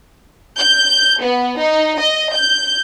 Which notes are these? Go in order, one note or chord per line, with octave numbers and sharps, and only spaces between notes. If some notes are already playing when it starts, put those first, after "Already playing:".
G6
B3
D#4
D#5
G6